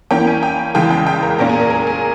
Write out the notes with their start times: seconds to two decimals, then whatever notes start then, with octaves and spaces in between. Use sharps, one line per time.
0.11 E3 A#3 C#4 G5
0.27 G#5
0.43 G5
0.75 C#3 E3 G#3 G5
0.91 G5
1.07 G5
1.22 A#4
1.38 A#2 A#3 C#4 A#4
1.49 G#4
1.60 A#4
1.70 A#4
1.87 G#4